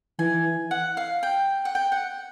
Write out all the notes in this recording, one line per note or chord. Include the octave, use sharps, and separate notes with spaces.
E3 G#5
F#5
F5
G5
F#5
G5
F#5